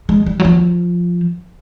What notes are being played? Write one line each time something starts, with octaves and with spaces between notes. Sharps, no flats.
G#3
G3
F#3
F3